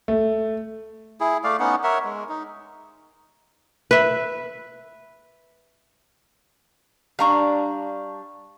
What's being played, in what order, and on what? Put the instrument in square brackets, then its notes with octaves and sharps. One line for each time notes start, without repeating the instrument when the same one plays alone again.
[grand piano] A3
[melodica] E4 G#4
A3 D5 F5
B3 C#4 D#4 F#5
A#4 C#5 E5 F#5
G#3
D#4
[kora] B4 E5
[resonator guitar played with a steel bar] G3 D4 [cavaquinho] F5 A#5 C#6